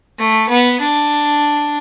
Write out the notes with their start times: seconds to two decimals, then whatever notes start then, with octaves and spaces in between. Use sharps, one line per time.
0.18 A3
0.49 B3
0.80 D4